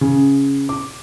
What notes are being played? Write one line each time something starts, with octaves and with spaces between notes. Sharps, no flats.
C#3
D6